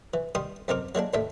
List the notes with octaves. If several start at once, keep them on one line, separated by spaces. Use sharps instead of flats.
E3
D#3 G3 C6 D#6
F#2 C4 D#4 A#4 D6
F#3 G#3 A#3 D4
D#2 A2 D#3 D4 E5